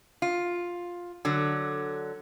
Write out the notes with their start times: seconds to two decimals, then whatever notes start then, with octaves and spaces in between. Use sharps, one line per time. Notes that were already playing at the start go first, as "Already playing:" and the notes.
0.22 F4
1.25 D3 F#3